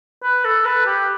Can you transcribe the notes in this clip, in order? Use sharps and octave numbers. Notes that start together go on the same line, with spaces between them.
B4
A4
B4
G4